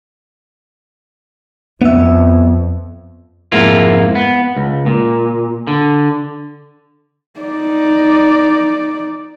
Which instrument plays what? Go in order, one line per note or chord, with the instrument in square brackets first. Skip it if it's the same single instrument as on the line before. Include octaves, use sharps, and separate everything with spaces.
[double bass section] F2 [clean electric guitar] B3 E5
[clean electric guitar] F2 G#2 A#3 E4 F4
B3
C#2
A#2
D3
[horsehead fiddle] D#4 D5